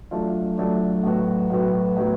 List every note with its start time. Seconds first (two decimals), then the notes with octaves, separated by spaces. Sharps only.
0.11 F#3 A3 D4 F4
0.58 F#3 A3 D4 F4
1.03 A2 F#3 B3 F#4
1.50 A2 F#3 B3 F#4
1.97 A2 F#3 B3 F#4